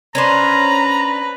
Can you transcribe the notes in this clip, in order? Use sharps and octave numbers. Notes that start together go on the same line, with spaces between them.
C#4 D4 B4 C5 A#5